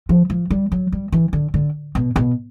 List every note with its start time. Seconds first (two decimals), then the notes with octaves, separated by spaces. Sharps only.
0.09 F3
0.30 F3
0.50 G3
0.72 F#3
0.92 G3
1.12 E3
1.33 D3
1.54 D3
1.95 B2
2.16 B2